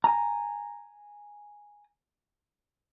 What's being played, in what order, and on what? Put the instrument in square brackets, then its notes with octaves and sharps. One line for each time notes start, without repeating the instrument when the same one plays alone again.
[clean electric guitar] G#5 A#5